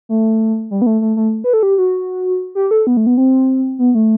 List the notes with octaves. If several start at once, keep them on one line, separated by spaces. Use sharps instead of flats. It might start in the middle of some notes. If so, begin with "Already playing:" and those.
A3
G3
B3
A3
A3
A3
B4
A4
G4
F#4
G4
A4
B3
A3
B3
C4
B3
A3